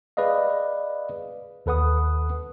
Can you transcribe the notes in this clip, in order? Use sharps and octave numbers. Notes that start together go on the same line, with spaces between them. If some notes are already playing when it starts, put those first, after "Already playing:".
G#4 B4 D5 D#5 F5
D#2 A4 B4 F#5 D#6